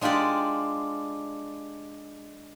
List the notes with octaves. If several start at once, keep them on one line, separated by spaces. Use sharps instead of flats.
G#3 D4 F4 G4 D5